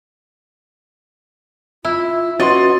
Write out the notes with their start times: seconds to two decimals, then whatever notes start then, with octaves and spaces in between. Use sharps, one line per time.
1.85 E4 F4
2.40 C#4 F#4 B4 D#5 C6 A6